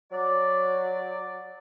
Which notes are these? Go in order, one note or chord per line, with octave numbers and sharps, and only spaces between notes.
F#3 D5